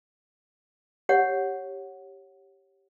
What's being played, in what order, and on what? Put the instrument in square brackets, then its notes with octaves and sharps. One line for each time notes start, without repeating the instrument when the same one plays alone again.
[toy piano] G4 C#5 F#5